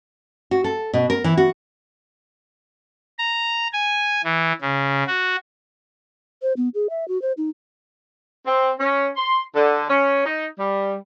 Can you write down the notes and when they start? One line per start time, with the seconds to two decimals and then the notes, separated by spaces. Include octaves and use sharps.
0.51 F#4
0.64 A4
0.93 B2
1.10 A#4
1.24 E3
1.37 F#4
3.19 A#5
3.73 G#5
4.24 E3
4.61 C#3
5.07 F#4
6.42 C5
6.57 B3
6.75 G#4
6.90 E5
7.08 F#4
7.22 C5
7.38 D#4
8.46 C4
8.80 C#4
9.17 C6
9.55 D3
9.90 C#4
10.26 D#4
10.59 G3